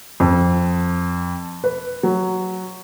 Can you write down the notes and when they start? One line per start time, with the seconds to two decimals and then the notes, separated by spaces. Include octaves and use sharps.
0.20 F2
1.64 B4
2.03 F#3